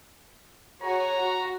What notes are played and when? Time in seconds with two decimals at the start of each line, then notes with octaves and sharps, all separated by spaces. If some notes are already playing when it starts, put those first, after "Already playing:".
0.83 F#4 G#4 C#5 A#5
1.17 F#4